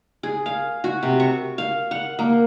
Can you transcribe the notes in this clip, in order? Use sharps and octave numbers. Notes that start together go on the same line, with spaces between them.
G#4
F5
F#4
C3
C#6
F5
F#5
A#3